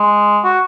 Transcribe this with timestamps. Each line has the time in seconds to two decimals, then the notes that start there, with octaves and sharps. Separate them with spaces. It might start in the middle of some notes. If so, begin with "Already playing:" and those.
Already playing: G#3
0.44 F#4